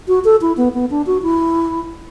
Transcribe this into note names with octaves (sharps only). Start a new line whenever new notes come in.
F#4
A4
E4
B3
B3
D4
F#4
E4